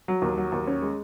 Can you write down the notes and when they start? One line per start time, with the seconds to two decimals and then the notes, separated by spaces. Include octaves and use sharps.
0.08 F#3
0.22 D#2
0.38 F#3
0.52 D#2
0.67 C#4
0.82 G#3